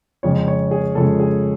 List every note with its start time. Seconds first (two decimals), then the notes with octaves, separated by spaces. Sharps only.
0.23 F2 C#3 F3 G#3 C#5
0.48 C#5
0.71 G#4
0.95 F2 C#3 F3 G#3 A4
1.20 G#4